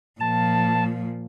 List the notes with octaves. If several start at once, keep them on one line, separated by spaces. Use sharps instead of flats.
A#2 F3 A5